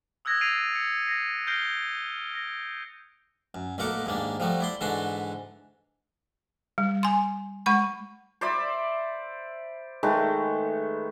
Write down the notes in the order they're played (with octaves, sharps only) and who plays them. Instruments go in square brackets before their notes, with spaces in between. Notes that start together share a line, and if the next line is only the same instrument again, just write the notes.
[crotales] D#6 E6 F#6 G#6 A#6
A6 C7 D7 D#7 F7
C#7
A#6 C7
F6 G6 A#6 C7 D7 G7
A#6
[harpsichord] F#2
B1 A#2 A3 A#4 F#5 D6
D#2 G#2 A#3 D4
F3 G3 A3 F#4
E4 D5 C6
G#2 D3 E3 D4 F#4 C6
[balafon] G3
G#5 C6
G#3 F#5 B5 C#6
[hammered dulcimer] C5 D5 E5 B5
D#3 G#3 A3 B4